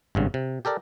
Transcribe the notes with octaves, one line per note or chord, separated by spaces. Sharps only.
G#1 G2 C#3
C3
G4 A4 A#4 D5